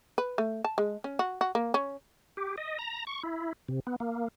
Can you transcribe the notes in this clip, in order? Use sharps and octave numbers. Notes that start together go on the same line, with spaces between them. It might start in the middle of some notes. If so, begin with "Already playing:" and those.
B4
A3
A5
G#3
C#4
F#4
F#4
A#3
C#4
G4
D#5
A#5
C#6
E4
C3
B3
A#3